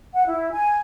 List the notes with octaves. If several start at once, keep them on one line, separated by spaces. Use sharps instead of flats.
F#5
E4
G#5